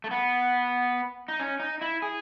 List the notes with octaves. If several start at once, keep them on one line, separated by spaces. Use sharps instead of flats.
A3
B3
D#4
C#4
D#4
E4
G#4